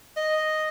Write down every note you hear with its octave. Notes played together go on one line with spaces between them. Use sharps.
D#5